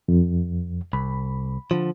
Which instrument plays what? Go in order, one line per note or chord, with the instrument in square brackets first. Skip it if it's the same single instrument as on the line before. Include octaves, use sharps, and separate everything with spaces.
[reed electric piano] F2
[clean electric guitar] C2 [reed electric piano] B5
[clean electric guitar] D3 F3